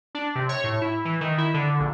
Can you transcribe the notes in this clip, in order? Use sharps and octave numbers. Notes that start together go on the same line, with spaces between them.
D4
C3
C#5
A2
E4
E3
D#3
E4
D3
A#1